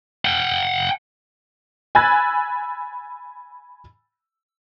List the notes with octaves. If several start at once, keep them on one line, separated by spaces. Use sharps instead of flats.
F#5 G5
G#5 B5 E6 F#6 G#6 A6